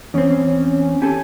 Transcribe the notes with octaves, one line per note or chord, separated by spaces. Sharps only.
E2 C4 C#4
G4 A4 G#5